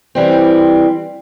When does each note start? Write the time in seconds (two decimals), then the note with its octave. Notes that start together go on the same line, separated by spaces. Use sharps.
0.15 E3 G3 C4